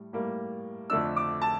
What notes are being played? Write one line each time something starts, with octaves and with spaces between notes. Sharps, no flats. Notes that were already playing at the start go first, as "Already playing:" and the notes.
Already playing: A2 G3
A2 G3 A#3
F2 D3 A3 D4 E6
D6
A5